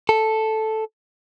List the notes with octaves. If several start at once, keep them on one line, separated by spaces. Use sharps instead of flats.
A4